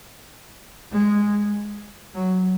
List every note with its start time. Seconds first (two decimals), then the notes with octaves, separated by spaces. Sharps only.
0.93 G#3
2.15 F#3